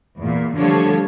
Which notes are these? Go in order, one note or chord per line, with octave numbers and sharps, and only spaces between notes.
E2 A#2
D3 F3 G3 A3 A4 C#5